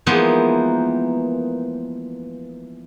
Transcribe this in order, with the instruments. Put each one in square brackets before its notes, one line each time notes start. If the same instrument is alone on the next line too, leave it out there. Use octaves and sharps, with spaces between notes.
[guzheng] E3 F3 G#3 A#3 B3 D#4